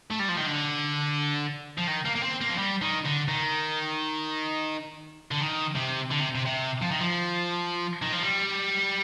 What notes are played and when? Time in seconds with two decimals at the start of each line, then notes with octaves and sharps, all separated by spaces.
0.11 A3
0.19 G3
0.29 F3
0.37 D#3
0.47 D3
1.78 F3
1.87 D#3
2.05 A#3
2.16 A#3
2.23 C4
2.41 A#3
2.50 F3
2.58 G3
2.82 D#3
3.05 D3
3.28 D#3
5.31 D3
5.40 D#3
5.75 C3
6.11 D3
6.19 C3
6.35 C3
6.46 C3
6.82 F3
6.91 D#3
7.00 F3
8.02 D#3
8.12 F3
8.23 G3